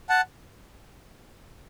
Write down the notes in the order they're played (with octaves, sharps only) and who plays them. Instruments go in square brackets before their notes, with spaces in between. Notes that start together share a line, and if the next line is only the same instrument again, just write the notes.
[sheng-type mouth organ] F#5 A5